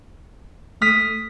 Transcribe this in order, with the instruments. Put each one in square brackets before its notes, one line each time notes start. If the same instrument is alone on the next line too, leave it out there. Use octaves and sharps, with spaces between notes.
[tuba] A3 [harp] D#6 F6 B6